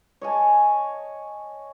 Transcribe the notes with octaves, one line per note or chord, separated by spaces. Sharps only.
C#5 D#5 G#5 A5